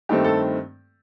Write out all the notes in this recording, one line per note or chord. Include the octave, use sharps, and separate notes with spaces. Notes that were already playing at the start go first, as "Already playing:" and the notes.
G2 D#3 A3 C4 G4
A4